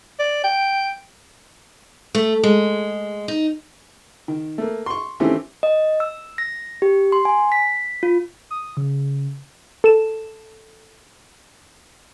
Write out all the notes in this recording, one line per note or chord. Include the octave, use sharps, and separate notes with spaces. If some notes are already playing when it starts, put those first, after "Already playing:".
D5
G5
A3
G#3
D#4
D#3
A3 A#3
C6 C#6
D#3 E3 A3 C4 C#4 G4
D#5
E6
A#6
G4
C6
G#5
B6
F4
D#6
C#3
A4 E7